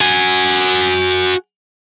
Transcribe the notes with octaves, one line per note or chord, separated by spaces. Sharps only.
F#4 G#5